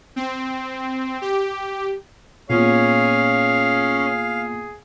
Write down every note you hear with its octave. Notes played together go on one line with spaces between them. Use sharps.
C4
G4
A#2 B3 C#4 G#4 F5